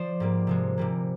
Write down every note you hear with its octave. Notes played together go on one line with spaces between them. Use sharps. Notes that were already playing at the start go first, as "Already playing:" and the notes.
Already playing: F3 C5 D5
G#2 G3 A#3
C3 F3 G#3
C3 G3 A#3